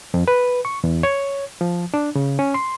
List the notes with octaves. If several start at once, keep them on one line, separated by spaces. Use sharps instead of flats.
F2
B4
C#6
E2
C#5
F3
D4
C#3
C#4
C6